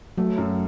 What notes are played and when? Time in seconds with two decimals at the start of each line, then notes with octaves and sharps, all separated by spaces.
0.18 F#3 A3
0.38 F#2